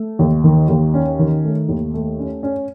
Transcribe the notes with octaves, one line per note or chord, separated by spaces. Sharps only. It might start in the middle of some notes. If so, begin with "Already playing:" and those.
Already playing: A3
D#2
D#3
D#2
C#4
D#3
A3
D#2
A3
C#4
C#4